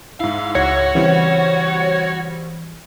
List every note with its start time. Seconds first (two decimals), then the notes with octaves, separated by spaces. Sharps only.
0.20 G#2 E4 F5
0.55 C#2 F#4 C#5 F#5
0.95 C#3 E3 G3 C4